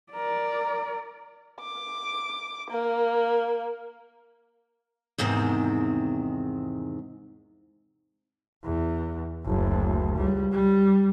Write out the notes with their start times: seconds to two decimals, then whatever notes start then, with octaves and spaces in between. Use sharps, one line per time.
0.12 A#4 D5
1.60 D6
2.70 A#3
5.18 E2 G#2 C3 D#3 C4
8.64 E2
9.46 F#1 D2
10.16 C#2 G3
10.52 G3